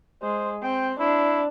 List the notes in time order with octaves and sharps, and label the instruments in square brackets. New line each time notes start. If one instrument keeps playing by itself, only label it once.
[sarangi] G#3 [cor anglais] C5
[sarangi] C4 [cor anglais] G5
[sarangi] D4 [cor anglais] E4